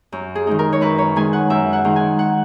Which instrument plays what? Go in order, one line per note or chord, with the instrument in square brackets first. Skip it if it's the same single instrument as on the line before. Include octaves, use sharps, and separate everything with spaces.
[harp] F#2
G#4
D#3 G#3 D#4
A#4
C#5
F#2 B4
C#5
D#3 G#3 D#4 G#5
F#5
F#2 E5
F#5
D#3 G#3 D#4
G#5
F#5